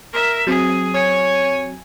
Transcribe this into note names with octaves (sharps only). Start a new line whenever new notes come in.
A#4 E5
F#3 C4 G#4
C#5 G#5